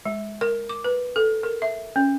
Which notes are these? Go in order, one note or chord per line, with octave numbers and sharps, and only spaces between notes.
G#3
A#4
D6
B4
A4
A#4
E5
C#4